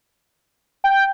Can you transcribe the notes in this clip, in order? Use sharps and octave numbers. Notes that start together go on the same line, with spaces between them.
G5